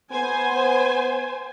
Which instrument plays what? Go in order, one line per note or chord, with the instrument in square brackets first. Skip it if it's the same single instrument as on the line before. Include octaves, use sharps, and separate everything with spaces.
[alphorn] B3 [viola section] C5 G#5